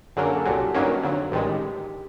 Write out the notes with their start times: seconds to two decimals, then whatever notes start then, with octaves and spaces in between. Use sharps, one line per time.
0.16 F#2 D3 F#3 A#3 G#4
0.27 A4
0.36 G#4
0.45 C2 A#2 F#3 G4
0.60 F#4
0.74 G2 D#3 F#3 A#3 C#4
1.03 F2 D3 F#3
1.31 A1 G2 D#3 G#3 G4